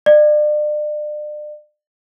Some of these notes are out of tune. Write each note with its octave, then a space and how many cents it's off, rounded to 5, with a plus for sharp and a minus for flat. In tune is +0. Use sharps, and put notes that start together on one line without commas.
D5 +35